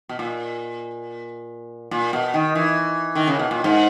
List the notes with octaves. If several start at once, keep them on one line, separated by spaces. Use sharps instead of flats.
B2
A#2
A#2
B2
D#3
E3
D#3
C#3
B2
A#2
G#2